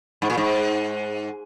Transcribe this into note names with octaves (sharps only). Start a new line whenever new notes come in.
G#2
A#2
G#2